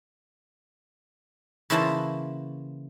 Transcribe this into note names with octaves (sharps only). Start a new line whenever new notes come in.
C#3 E3 A#3 E4 C5 A5